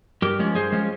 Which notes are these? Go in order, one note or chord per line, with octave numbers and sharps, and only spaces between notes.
G2 G4 A#4
F3 G#3 C#4
G2 G#4 C5
F3 G#3 C#4